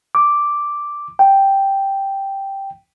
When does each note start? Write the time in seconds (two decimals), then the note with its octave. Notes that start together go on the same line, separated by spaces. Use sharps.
0.15 D6
1.19 G5